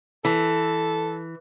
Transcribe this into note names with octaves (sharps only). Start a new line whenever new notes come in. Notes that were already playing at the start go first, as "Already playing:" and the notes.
E3 A4